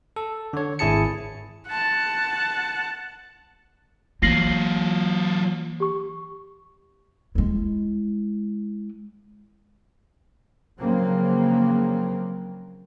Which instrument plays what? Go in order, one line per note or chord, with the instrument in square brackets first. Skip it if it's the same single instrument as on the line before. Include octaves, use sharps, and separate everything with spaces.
[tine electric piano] A4
D3 C#5
G#1 E4 G#4 A5 C#7
[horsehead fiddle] F#5 A5
[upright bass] E3 A#3 [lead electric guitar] F#3 F4 [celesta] A#6 C7 F#7
[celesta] G4 C#6
[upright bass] G#3 E4
[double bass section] C#3 F3 F#3 A#3 C4